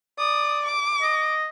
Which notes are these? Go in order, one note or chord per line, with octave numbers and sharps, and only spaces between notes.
D5 D#6
D6
D#5